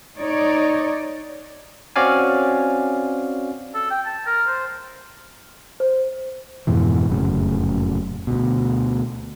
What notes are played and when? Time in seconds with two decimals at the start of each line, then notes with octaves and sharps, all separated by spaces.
0.18 D#4 C#5 D5
1.96 C4 C#4 F#4 D5 F5 G#5
3.74 A4
3.91 G5
4.06 A5
4.26 A#4
4.47 C5
5.80 C5
6.67 F2 G#2 B2 E3
7.09 F1 F#2 A2 C#3
8.27 D2 B2